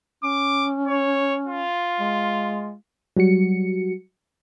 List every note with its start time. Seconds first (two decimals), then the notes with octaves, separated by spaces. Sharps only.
0.24 C#4 D6
0.88 C#5
1.47 F4
2.00 G#3
3.17 F#3 G3 F#4 C#7